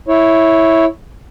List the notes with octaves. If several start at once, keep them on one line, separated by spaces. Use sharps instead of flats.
E4 C#5